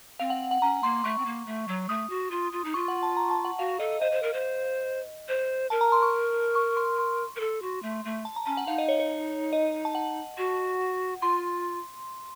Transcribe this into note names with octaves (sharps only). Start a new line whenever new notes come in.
C4 F5
F#5
F#5
C#4 A#5
A#3 C6
A3 C#6
C4
A#3
A3
F#3
A3 D#6
F#4
F4
F4
D#4
F4 C#6
F#5
A5
A#5
A5
F#5
F#4 F5
A4 D#5
C5 D#5
C5
A#4
C5
C5
A#4 A5
A#5
C6
C#6
C#6
C6
C6
A#4
A4
F#4
A3
A3
A5
A#5
C#4 A5
F#5
D#4 F5
D#5
C#5
C#5
D#5
A5
F#5
F#4
F4 C6